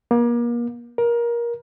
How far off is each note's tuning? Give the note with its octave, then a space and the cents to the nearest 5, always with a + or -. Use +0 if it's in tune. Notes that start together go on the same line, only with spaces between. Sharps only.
A#3 +35
A#4 +20